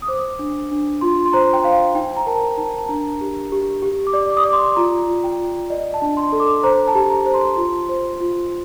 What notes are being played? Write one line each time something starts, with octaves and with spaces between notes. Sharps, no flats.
D#6
C5 D6
D4
D4
F4 C6
C6
C5 A#5
G5
C5 F5
D#4 G5
A#5
A#4 A5
D#4 A5
A5
D4 A#5
G4
G4
G4
D6
D5
D6
D#6
D5 D6
C6
F4 A#5
F4
G5
F4
D5 D#5
A5
D4
C6
A4
D6
C5 A#5
A5
G4
A#5
C5
C6
F4
C5
F4